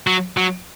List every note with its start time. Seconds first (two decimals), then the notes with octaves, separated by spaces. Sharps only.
0.07 F#3
0.37 F#3